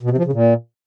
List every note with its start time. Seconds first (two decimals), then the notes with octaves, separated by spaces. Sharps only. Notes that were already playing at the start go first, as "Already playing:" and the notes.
0.03 B2
0.10 C3
0.18 F3
0.25 C#3
0.33 A#2